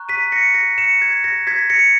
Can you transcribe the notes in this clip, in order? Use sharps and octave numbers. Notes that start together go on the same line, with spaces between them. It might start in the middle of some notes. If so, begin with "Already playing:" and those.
Already playing: A#5 C#6 F#6
B6 D#7
A#6 C#7
A#6
C#7 E7
G#6
A#6
G#6 B6
A#6 C#7